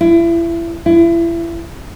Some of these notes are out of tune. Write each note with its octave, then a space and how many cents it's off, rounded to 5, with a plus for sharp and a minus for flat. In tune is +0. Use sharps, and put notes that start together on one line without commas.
E4 +30
E4 +30